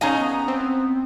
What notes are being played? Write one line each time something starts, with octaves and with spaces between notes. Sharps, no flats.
C#4 D#4 G#4 D#5 F5 G#5 A#5
B3
C4